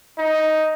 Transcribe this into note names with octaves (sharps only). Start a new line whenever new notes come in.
D#4